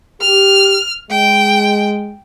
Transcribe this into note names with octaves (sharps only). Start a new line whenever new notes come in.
G4 F6
G#3 G5